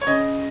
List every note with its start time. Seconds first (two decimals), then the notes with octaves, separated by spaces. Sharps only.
0.01 C#5
0.07 C#3 D#5